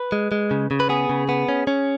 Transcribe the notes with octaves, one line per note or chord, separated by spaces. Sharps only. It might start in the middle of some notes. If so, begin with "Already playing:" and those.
Already playing: B4
G#3
G#3
C#3
C#3
B4
B3 G#4
C#3
B3
C#4
C#4